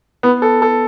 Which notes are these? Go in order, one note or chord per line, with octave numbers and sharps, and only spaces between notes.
B3
A4
A4